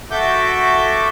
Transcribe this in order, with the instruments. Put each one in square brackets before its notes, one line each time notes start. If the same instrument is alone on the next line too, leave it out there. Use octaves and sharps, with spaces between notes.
[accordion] F#4 A4 E5 D6 G6